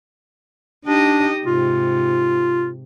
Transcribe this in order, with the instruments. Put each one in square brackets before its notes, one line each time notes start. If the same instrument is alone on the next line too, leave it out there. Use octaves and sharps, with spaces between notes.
[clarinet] D4 [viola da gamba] D#4 G4 D#5
[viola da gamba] G#2 C3 [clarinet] F4